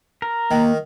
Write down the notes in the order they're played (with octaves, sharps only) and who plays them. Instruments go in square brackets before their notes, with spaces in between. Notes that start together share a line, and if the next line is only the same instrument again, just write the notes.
[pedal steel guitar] A#4
[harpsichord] D#3 [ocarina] A#3